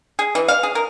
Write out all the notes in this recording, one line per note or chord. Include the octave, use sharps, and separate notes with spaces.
G#4
E3
F5
G#4
A#4